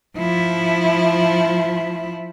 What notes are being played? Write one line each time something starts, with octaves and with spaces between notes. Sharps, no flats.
F3 E4